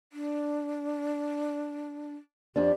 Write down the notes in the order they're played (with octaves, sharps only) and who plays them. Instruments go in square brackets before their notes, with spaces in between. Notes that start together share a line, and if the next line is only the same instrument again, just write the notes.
[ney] D4
[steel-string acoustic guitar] F2 D4 [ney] G4